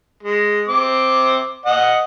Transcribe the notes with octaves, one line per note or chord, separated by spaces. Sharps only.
G#3
C4 D6
D#5 F#5